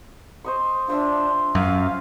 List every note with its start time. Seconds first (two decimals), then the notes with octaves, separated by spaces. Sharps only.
0.45 C5 D#5 C#6
0.88 D4 F4 C5 E5
1.55 F#2 F5